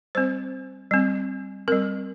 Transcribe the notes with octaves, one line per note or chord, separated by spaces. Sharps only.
G3 C4 C5
G3 C4
G3 C4 A#4